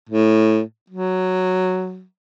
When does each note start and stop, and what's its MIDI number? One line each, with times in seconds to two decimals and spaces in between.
0.09 0.61 45
0.90 2.04 54